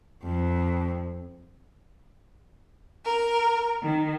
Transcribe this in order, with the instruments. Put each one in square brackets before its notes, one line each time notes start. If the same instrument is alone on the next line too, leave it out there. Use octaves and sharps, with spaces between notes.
[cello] F2
[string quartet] A#4
D#3